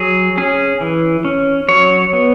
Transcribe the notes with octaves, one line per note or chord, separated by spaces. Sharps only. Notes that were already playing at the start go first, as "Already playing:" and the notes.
Already playing: F#3 G#4
C#4 G#4
E3
C#4
F#3 C#5
B3